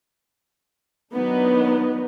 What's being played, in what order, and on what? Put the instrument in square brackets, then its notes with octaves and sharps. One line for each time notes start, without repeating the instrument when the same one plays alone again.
[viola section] D#3 F#3 B3 D4 D#4